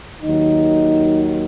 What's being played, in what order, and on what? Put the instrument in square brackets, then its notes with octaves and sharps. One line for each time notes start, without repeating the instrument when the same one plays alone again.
[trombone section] D#2 D#3 F#3 D#4